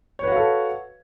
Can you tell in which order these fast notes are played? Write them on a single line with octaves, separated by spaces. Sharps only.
C#5 B4 F#4 F5 A4